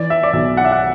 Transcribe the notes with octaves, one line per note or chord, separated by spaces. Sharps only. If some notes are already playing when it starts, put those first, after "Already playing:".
Already playing: E3 D5
E5
D5
B1 E5
F#5
E5
F#5